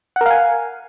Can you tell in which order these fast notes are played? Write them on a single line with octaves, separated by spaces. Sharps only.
F#5 A#4 F5 G#5